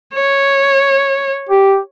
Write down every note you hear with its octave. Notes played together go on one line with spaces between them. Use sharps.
C#5
G4